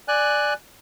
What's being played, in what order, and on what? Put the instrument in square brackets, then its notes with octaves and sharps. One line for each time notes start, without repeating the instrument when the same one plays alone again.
[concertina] D5 G#5 F#6